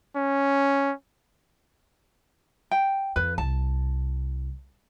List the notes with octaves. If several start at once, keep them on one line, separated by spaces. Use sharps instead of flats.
C#4
G5
F2 B4
C2 A5